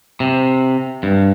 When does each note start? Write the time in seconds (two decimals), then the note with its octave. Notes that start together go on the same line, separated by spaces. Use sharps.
0.20 C3
1.03 G2